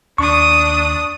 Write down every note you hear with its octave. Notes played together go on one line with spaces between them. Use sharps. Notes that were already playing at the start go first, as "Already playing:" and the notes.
D#2 D4 C#6 D#6